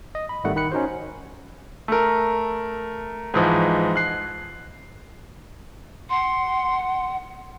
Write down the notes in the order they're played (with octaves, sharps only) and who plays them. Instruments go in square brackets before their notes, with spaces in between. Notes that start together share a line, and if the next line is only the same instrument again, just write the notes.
[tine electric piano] D#5
B5
G#1 D#3 G3 A3 F#5
D#3 B5 F#6 C#7
C#4 D#4 F#4 C5
[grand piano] A3 A#4
G#2 E3 F3 D#4
F#6 C7
[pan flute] F#5 [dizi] C6